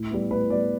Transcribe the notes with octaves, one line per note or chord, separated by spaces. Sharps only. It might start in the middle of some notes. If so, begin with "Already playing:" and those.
Already playing: A2
G3 B3
A2 B4
G3 B3 D5